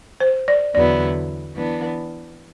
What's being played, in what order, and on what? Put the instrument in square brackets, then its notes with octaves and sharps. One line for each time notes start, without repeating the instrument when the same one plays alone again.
[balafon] C5
D5
[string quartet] E2 D3 F#3 B3 E4 [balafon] D5
[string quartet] E3 B3 D4